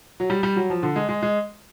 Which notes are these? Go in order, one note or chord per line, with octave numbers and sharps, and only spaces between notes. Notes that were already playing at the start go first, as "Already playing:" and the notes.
F#3
G3
G3
F#3
F3
D3
G#3
G#3
G#3